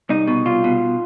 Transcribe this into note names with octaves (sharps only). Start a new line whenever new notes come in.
C2 D#4
B2
C2 F4
B2